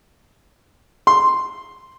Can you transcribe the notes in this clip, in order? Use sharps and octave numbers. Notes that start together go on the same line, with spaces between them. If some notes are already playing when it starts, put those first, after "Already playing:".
C6